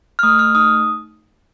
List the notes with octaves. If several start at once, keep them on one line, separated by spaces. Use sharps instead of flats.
F6
A3 D#6
F6
D#4 D#6